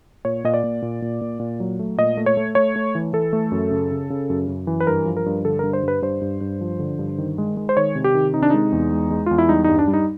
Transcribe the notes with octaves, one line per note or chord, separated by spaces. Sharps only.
A#2 C#5
A#2 D#5
D5
A#2
A#2
A#2
A#2
A#2
F#3
A3
A#2 D#5
A3
C#5
A3
A3 C#5
A3
E3
E3 A4
A3
F#2
C#3
C#3
C#3
F#2
F#2
E3
B4
G2 A#4
F3
A#4
G2
D3 A4
G2 A#4
C5
G2 B4
G2 C5
G2
G2
F3
D3
G2
D#3
G#3
G#3
C5
D#3 C#5
C3
G4
D#3
C3 D#4
D4
G#3 D#4
E2
G#3
G#3
E2 F4
E4
G3 D#4
G2 D#4
D4
G3
D#4